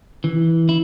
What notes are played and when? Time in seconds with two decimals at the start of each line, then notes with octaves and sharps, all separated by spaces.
0.24 E3
0.69 E4